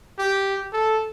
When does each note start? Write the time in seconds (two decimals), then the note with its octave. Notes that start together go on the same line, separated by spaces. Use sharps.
0.19 G4
0.73 A4